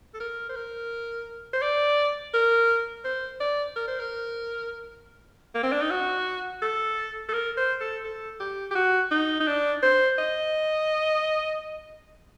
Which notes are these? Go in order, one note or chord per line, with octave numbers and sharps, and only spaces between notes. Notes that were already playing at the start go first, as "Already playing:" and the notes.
A4
A#4
C5
A#4
C5
D5
A#4
C5
D5
A#4
C5
A#4
A#3
C4
D4
D#4
F#4
A4
A4
A#4
C5
A4
A4
G4
G4
F#4
D#4
D#4
D4
C5
D#5